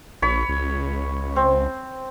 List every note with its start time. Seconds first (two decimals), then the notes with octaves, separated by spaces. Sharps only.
0.22 A#1 C#5 B5
0.49 C#2
1.36 C4